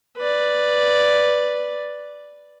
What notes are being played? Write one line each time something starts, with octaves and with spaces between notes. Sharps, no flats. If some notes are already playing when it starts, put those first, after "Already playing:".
B4 D5